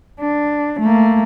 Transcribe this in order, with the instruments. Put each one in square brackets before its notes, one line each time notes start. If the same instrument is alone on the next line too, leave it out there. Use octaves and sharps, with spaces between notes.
[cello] D4
A3 A#3